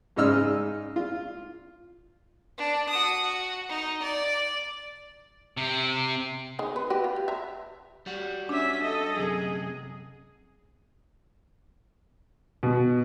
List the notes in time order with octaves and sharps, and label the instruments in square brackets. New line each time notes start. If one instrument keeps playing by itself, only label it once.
[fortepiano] G#2 C#3 D#4 D#5 E6 F6
F4
[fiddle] D4
F#4 D#6
F#4
D#4
D5
[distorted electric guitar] C3
[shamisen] D#3 G#4
B4
F#4 G4 B4
F4
G4
E5 A#5
[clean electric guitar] G3 F#4
[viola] C#4 E5 [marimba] D4
[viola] A4 D#5
[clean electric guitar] F#2 C3 [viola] G#4
[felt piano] B2